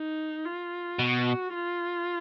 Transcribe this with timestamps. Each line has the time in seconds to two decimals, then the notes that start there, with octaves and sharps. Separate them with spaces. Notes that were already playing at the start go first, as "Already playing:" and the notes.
Already playing: D#4
0.45 F4
0.99 B2 F#4
1.54 F4